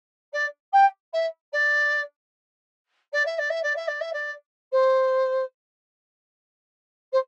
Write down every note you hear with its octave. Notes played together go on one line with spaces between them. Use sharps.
D5
G5
E5
D5
D5
E5
D5
E5
D5
E5
D5
E5
D5
C5
C5